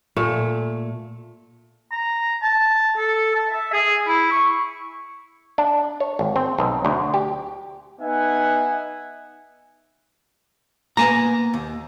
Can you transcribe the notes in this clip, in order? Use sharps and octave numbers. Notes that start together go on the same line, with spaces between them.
A#2 A3
A#5
A5
A4
A5
E5
G#4
E4
C#6
D4
C#5
G#1
C4
B1
D2
G4
B3 D#4 E5 F#5 G#5
A#3 B3 G#5 A#5
D#2